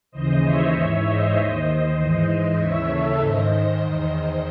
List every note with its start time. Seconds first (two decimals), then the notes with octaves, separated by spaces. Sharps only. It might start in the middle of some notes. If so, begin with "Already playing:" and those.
0.11 D#2 C#3 E3 C5 D#5
0.43 C#5 E5
0.73 G#2 E3 C#5 E5
1.04 C5 D#5
1.35 D#2 D#3
1.97 G#2 E3
2.57 D#2 C#3 E3 C#5 E5
2.89 A4 C#5
3.19 G#2 D#3 C5 D#5
3.81 E2 D#3 C5 D#5